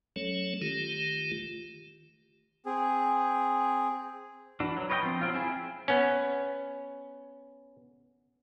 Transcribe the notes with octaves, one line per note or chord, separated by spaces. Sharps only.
F#3 A3 C#4 A4 C#5
D#3 A3 F4 G4
C4 G#4
E3 D4 F#4
F#3
B4 C#5 D#5 F5 G5
F3 C4
F#3 C4 F4
C4 E4 G#4
B3 C#4